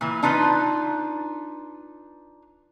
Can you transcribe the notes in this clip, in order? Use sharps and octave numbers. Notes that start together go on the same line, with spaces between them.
A#2 E3
D4 D#4 F4 B4